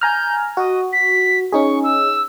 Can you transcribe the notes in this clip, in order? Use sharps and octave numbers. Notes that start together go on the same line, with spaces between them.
G#5 A#5 F6 G6
F#4 D#5
B6
C#4 D#4 G#4 C#6
E6